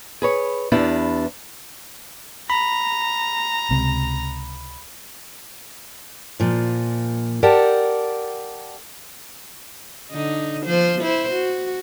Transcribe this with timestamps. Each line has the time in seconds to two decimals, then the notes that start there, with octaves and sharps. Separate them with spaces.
0.22 G#4 B4 C#5
0.72 E2 B3 D4 E4 G4
2.50 A#5 B5
3.71 C#2 C3
6.40 A#2 F3
7.43 G4 A#4 D5 F#5 G5 A5
10.11 D3 D#4
10.65 F3 C5
11.01 E4 C5
11.32 F#4